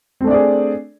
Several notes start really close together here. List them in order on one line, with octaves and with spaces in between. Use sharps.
C4 A3 D4 D5 G#4